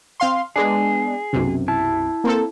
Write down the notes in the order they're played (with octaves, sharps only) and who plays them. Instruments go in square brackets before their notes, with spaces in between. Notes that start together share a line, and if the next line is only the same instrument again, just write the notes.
[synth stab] C4 F5 C6
[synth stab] G#3 B3 D4 [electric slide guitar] G#4
[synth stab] B1 F#2 C3
[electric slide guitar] E4 A5
[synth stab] A#3 C4 A4